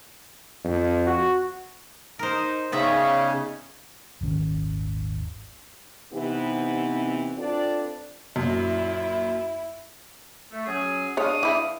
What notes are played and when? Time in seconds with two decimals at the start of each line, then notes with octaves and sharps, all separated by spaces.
0.64 F2
1.07 F#4
2.19 D#4 A#4 C5
2.72 C#3 G3 B3 C#4 D#4 G#4 E5
4.21 D#1 G#1 D#3 C#4
6.13 C3 E3 B3 C4 D#4 G4
7.38 C4 D4 F4 A4 B4 D5
8.36 F#2 A#2 E4
10.52 A3
10.66 F#3 C#4 G#4
11.17 G#3 D4 C#5 F5 D#6
11.43 E3 E4